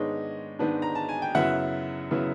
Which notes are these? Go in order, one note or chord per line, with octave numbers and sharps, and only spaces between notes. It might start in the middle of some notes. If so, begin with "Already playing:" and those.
Already playing: G#2 D#3 G#3 B3 D4 C#5 D#5
G#2 D#3 G#3 B3 D4
A#5
A5
G#5
G5
F#2 C#3 F#3 B3 E4 E5 F#5
C#3 F#3 B3 E4